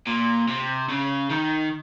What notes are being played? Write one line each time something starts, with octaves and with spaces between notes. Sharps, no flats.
A#2
C3
C#3
D#3